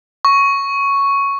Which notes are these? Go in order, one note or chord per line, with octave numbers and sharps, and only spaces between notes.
C#6